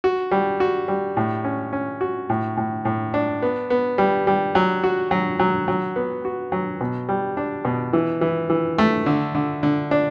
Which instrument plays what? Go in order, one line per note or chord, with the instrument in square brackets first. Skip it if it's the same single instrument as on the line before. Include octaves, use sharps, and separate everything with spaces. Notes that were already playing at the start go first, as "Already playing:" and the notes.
[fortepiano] F#4
G3
F#4
G3
A2
C#4
C#4
F#4
A2
A2
A2
D4
B3
B3
G3
G3
F#3
F#4
F#3
F#3
F#3
B3
F#4
F#3
B2
G3
D4
B2
E3
E3
E3
A3
D3
D3
D3
D4